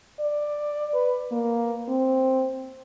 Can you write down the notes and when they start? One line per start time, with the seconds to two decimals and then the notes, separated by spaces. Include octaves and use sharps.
0.20 D5
0.94 B4
1.32 A#3
1.88 C4